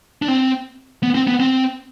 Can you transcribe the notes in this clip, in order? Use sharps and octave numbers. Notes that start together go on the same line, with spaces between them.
D4
C4
B3
C4
B3
C4